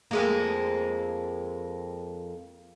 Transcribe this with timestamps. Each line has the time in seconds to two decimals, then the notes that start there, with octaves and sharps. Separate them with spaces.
0.11 F2 G#3 A#3